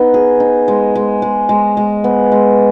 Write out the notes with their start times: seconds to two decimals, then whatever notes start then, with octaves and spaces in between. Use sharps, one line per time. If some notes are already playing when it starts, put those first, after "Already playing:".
Already playing: B3 D#4
0.14 G#4
0.40 D#4
0.68 G#3
0.96 G#3
1.22 G#3
1.49 G#3
1.77 G#3
2.04 B3
2.32 G#3